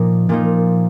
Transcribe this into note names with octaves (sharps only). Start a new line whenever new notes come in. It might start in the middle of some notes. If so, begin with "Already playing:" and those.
Already playing: A#2 F3 A#3 D#4
A#2 F3 A#3 D#4